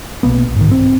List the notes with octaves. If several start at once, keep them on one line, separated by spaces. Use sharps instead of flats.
B1 A#3 B3
G#2 D#3
C4